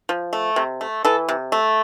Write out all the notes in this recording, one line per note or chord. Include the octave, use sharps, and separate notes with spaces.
F3
A3
C3
A3
E3 A4
C3
A3